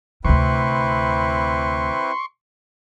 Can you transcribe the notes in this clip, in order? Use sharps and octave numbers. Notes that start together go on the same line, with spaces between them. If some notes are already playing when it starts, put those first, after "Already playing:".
D2 C3 C4 E4 B4 C6 C#6